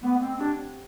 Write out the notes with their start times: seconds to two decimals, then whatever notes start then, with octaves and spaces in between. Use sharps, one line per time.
0.02 A3 B3
0.20 C4
0.38 C4 D4 G4